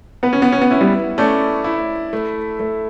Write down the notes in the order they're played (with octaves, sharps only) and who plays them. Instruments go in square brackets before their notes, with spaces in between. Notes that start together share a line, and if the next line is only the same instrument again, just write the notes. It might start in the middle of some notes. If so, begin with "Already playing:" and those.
[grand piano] B3 [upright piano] B4
[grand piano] C#4
B3
C#4
B3
[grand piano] C#4 [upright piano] E4
[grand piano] G3 B3
[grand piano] A3 C#4 [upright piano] D5
[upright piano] E4
A3
A3